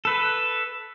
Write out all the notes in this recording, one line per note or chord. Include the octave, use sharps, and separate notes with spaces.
A4 B4